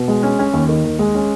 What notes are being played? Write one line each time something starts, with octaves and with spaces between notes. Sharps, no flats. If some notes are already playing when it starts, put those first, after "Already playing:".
Already playing: B2
G#3
C#4
C#4
D#2
D#3
D#2
G#3
C#4